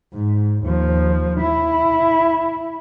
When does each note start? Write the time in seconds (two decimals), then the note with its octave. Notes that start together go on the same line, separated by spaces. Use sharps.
0.13 G#2
0.63 D#2 F3
1.41 E4